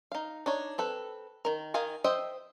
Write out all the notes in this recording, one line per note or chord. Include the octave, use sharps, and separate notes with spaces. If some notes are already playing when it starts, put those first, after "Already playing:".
D#4 F5
D4 D#4 C#5
C4 A4 B4
D#3 A#4
D#3 D#5 F5 G#5
C5 D#5 E5 G5